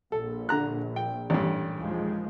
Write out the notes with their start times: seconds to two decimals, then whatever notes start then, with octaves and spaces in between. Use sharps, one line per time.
0.12 A#1 A4
0.49 D3 A#5 F#6
0.96 G5
1.30 A1 G2
1.78 D#2 F3 G#3